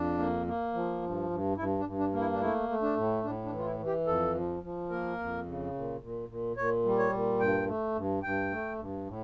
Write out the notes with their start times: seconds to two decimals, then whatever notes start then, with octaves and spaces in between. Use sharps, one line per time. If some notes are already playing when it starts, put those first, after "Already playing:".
Already playing: F2 D4
0.19 A#3
0.47 A#3
0.74 F3
1.02 G2
1.30 G2
1.57 G2 E4
1.79 D4
1.85 G2
1.99 D4
2.13 A#3
2.20 E4
2.33 D4
2.41 A3 E4
2.69 A3
2.82 D4
2.97 A2
3.24 A2 D4
3.45 D4
3.52 E3
3.58 F4
3.66 E4
3.79 E3
3.87 G4
4.07 F2 A4
4.35 F3
4.63 F3
4.90 A#3 A#4
5.19 F2
5.46 C#3
5.74 A#2
6.01 A#2
6.29 A#2
6.57 A#2 C#5
6.85 G3
6.99 C#5
7.12 A#2
7.40 G2 G5
7.68 A3
7.95 G2
8.23 G2 G5
8.51 A3
8.79 G2
9.06 A2